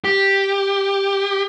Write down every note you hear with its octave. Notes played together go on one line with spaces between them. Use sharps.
G4